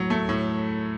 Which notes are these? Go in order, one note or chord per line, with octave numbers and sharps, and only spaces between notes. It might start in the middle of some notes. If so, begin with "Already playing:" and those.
Already playing: A2 F#3
A3
A2